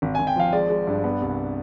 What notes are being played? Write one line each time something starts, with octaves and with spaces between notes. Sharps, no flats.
G#1
G#1 G#5
G5
F3 F5
G#3 D5
G#3
G2
B3
C2